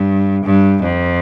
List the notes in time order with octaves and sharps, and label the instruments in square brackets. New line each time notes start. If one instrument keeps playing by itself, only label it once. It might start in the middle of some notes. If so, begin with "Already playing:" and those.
Already playing: [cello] G2
G2
F2